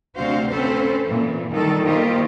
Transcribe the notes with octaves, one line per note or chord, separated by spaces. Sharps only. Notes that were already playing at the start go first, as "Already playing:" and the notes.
D2 C3 D4 F#4 C5 F5
C4 C#4 A4 B4 C5
A#2 E3
D#3 G3 A4
D#3 G3 A#3 F4 G4 C5